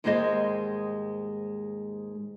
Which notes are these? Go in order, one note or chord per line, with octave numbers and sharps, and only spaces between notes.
D#2 G#2 G3 G#3 C5 D#5